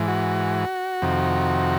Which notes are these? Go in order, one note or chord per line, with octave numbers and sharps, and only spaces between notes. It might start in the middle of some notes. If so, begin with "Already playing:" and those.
Already playing: G#2 E3
F#4
F2 C3 D#3